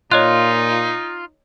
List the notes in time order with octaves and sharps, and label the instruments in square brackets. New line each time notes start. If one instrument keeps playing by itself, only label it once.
[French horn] A#2 [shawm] D#4 [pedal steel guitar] F4 [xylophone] C#5 D#5 F#6